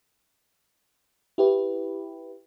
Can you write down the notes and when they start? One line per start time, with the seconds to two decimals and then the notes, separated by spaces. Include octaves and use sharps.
1.38 E4 G4 B4